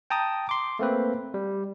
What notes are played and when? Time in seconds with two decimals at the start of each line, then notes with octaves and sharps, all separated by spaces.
0.10 G5 A5 A#5 D#6
0.49 C6 D6
0.79 A3 A#3 C4 B4
1.34 G3